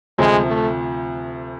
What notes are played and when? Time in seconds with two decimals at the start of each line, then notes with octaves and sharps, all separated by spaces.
0.18 D2 C3 F3 G#3
0.47 A3